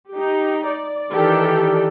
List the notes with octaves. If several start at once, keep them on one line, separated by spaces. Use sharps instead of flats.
D#4 G4
D5
D#3 E3 G4 A4 D5